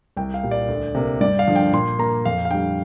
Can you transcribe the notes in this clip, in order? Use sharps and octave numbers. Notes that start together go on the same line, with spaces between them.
C2 G5
F5
A#2 G3
D5
D2
C3 A#3
G2 D5
F5
D3 F3
G5
A#2 C6
A#3 A#5
F2 F5
F5
D3 G3 G5